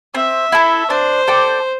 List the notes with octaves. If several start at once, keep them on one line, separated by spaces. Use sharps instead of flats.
C4 E5
E4 A4
D4 C5
A4 D5 G5